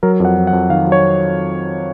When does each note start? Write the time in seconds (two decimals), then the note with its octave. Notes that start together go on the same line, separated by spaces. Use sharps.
0.03 F#3 A#4
0.20 F2 F#5
0.37 F2
0.47 F#5
0.53 F2
0.69 D#3 F5
0.87 F#3
0.92 C#5